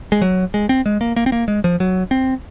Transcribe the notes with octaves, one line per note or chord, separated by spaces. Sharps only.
G#3
F#3
G#3
C4
G#3
A#3
A#3
C4
A#3
G#3
F3
F#3
C4